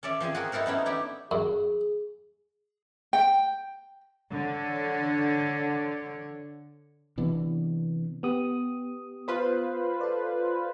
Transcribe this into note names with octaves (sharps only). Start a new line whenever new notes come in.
C#4 A4 D5 E5
F3 C4 G#4 G#5
F#4 G#4 A#4
D#4 E4 A4 A#4 C5
B3 C#4 D#4 E4
D4 E4 G4
F#2 G#4
G5
D3 C#5
C3 E3 B3 D4
B3 G4 D#6
F4 B4 C5
A4 D5